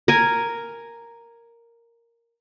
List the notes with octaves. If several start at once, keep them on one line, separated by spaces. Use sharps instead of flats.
A#4 G#5